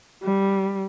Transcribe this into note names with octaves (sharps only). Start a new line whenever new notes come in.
G3